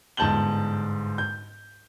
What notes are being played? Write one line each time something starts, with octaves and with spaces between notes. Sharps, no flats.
G1 G#2 A5 G6 F#7 G7
G6